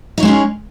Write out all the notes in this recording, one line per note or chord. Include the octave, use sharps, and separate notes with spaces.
G#3 C#4 D#4 G#4 C#5